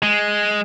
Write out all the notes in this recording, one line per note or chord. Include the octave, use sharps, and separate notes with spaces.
G#3